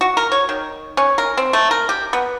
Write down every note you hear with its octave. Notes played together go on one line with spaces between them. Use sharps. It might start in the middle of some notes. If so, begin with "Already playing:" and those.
F#4
A#4
C#5
D#3
C#4
A#4
C4
A3
A#4
G4
B3